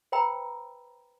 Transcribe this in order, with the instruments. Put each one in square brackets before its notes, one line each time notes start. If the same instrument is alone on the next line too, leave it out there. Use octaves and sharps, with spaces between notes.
[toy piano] B4 C5 G5 A#5 B5 E6